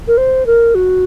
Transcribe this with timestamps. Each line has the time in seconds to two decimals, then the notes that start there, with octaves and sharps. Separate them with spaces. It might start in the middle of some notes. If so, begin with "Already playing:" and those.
0.07 A#4
0.17 C5
0.46 A#4
0.75 F#4